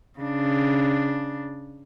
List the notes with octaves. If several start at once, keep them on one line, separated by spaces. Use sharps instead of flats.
C#3 D4